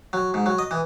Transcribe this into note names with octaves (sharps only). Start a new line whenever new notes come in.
F#3
G#2
F#3
D#5
E3